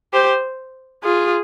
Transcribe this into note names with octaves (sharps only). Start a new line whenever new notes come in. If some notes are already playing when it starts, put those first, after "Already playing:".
G4 C5
F4 G#4